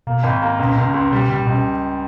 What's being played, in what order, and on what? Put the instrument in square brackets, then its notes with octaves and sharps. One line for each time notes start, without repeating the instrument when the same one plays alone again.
[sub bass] B2 [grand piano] A#3
[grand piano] G#1
A#3
[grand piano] C#2 [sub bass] B2
[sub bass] A#2
[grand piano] C#2 [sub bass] B2
[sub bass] C#3
[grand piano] C#2
[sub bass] B2 [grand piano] G3
[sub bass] C#3 [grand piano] G3
[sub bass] A#2
[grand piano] C#2 [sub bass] B2